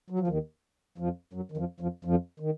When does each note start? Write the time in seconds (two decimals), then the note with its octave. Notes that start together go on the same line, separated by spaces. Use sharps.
0.10 F#3
0.19 F3
0.28 D#2 D#3
0.98 F2 F3
1.33 F#2 F#3
1.52 D#3
1.57 F2 F3
1.80 F2 F3
2.05 F2 F3
2.40 D#3